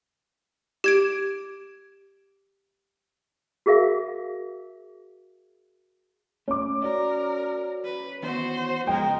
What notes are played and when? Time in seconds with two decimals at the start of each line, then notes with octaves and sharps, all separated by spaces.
0.84 G4 G#6 D7
3.66 F#4 G#4 A#4 E5 F5 D6
6.48 A3 C#4 D6
6.83 F#4 A#4 D5
7.85 B4
8.23 D#3 E3 B3 F#4 C5
8.87 C#3 F3 G#3 B3 A#4 G5